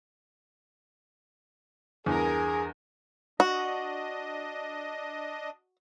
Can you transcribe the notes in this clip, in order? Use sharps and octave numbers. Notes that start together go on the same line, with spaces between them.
E2 G2 G#4 A#4 G#5
D4 F#4 D#5